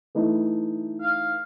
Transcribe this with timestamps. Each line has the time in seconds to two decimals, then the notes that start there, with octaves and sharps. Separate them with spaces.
0.15 E3 A3 D#4
1.02 F5